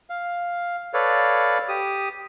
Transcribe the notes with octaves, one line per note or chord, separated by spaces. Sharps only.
F5
A4 B4 C#5 D5 F5
G4 D#6